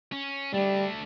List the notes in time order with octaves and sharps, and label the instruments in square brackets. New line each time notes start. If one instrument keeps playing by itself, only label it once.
[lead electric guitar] C#4
[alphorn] G3 [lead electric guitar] A3 D4